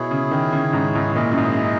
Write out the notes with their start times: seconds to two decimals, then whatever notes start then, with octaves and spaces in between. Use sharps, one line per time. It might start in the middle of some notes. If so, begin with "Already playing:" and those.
Already playing: B2 E4 G#4 C#5
0.11 C#3
0.31 D#3
0.52 C#3
0.73 G#2
0.95 G#2
1.15 A#2 E4 G#4 D#5
1.32 F#2
1.37 G#2